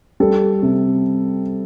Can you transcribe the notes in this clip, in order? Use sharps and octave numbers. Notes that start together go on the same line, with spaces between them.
G3 A4
C3